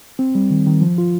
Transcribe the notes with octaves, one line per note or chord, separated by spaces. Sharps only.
C4
G3
D#3
D#3
F3
F4